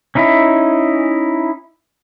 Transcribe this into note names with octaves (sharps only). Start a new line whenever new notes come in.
C#4 D#4 E4